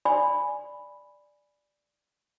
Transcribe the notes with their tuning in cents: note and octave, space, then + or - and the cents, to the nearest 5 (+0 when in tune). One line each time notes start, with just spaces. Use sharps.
D5 +0 G#5 +0 B5 +0